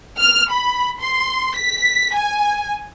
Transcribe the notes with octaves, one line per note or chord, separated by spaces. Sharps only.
F6
B5
C6
B6
G#5